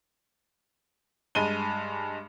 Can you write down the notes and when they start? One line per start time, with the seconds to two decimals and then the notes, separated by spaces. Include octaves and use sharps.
1.35 G2 G#3 D#7 G7